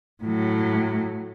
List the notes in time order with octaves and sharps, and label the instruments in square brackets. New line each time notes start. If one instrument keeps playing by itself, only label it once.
[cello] A2 F#3